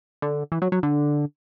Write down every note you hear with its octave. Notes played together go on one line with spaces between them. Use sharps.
D3
E3
F#3
F#3
D3